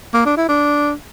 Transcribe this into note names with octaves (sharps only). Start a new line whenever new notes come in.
A#3
D4
E4
D4